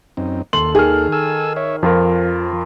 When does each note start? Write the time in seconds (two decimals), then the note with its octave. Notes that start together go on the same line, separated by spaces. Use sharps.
0.17 F#2 C4 D#4
0.53 D#2 A4 C6 F#7
0.75 D#3 G#4 F6
1.12 A4 G#5 E6
1.56 C#5 E5
1.83 F2 F3 F4 A#4